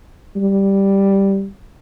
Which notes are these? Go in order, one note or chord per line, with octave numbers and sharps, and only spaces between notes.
G3